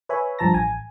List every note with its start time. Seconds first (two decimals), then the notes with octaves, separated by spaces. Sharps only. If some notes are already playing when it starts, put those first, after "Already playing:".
0.09 B4 C#5 E5 G#5 B5
0.39 G2 F3 A5 A#5 A#6
0.53 A1 G#5